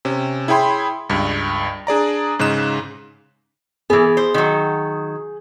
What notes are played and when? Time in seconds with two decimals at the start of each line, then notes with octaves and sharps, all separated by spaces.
0.05 C3 C#4
0.48 E4 G#4 C#5 G5 B5 C6
1.10 C#2 G2
1.87 D4 G#4 D5 A#5
2.39 G#2 C#3 D#4 F#6 E7
3.90 E3 B3 G#4
4.17 C5
4.34 D#3 F#3